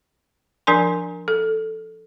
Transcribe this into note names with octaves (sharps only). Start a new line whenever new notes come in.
F3 D4 A#4 G#5 C6
A4